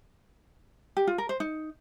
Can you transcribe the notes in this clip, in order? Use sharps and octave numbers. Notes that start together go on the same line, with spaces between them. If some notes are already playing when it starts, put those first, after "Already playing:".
G4
F4
A#4
C5
D#4